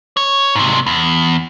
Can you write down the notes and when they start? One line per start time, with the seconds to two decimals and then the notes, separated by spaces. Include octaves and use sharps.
0.17 C#5
0.55 G#2 C3
0.87 E2